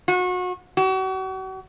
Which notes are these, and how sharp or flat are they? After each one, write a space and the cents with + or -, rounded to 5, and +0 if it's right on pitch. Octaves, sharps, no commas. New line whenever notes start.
F#4 -30
F#4 +40